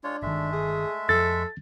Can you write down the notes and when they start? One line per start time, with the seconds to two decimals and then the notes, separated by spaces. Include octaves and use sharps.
0.04 G#3 D4 F4 C#5
0.22 G1 D#3 G#3 A3 E5
0.53 G#4
1.09 F2 A4 A6